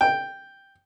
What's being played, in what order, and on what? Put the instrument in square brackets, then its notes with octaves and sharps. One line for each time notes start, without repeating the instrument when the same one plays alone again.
[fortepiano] G5